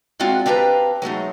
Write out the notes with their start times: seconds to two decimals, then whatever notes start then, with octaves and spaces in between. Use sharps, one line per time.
0.20 G#3 C4 D4 F4 F#4
0.46 C4 D4 G4 B4 F5 A#5
1.02 F#3 G#3 A3 D#4